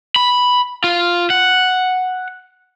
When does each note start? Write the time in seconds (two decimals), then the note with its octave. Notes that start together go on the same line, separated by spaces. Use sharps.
0.16 B5
0.84 F4
1.30 F#5